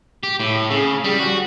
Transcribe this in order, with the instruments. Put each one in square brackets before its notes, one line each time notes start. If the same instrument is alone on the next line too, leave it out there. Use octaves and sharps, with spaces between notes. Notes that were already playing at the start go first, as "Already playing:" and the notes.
[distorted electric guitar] G4
A2
C#3
G3
F#4